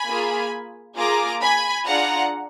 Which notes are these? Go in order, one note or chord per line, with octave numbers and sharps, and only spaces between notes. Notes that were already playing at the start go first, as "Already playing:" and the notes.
Already playing: G#5 B5
A#3 F4 G#4
A#3 F4 G#4 A#5 D6
G#5 B5
D4 F4 G#4 F#5 A#5